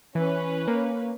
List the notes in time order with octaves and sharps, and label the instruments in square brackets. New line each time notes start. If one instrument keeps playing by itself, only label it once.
[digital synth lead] E3 [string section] C#4 B4
[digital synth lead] A#3